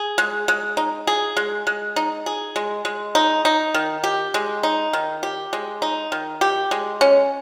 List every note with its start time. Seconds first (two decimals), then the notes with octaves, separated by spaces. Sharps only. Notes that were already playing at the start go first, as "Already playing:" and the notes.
Already playing: G#4
0.18 G#3
0.48 G#3
0.77 D#4
1.07 G#4
1.37 G#3
1.67 G#3
1.96 D#4
2.26 G#4
2.56 G#3
2.85 G#3
3.15 D#4
3.45 D#4
3.74 D#3
4.04 G4
4.34 G#3
4.63 D#4
4.93 D#3
5.23 G4
5.53 G#3
5.82 D#4
6.12 D#3
6.41 G4
6.71 G#3
7.01 C#4